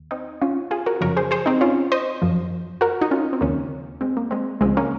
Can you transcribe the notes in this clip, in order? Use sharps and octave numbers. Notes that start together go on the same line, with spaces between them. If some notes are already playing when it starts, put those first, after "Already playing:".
Already playing: D#2
C4 D#4
C#4 F4
F4 G#4
F#4 A#4
F#2 C#3 F3 A#4 C#5
G#4 C5
G#4 C5
C4 D#4
C#4 F4
C5 D#5
F#2 F3
F#4 A#4
D#4 F#4
C#4 F4
C4
D#2 C#3 F3 A#3 C#4
G#3 C4
A#3
G#3 C4
C#2 C#3 F3 G#3 C4
A#3 C#4